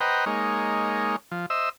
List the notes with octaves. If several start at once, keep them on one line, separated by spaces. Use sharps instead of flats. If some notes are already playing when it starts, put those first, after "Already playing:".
B4 C5 D#5 F#5 G5 A#5
G#3 A#3 D#4 C#5
F3
C5 D#5 E5 E6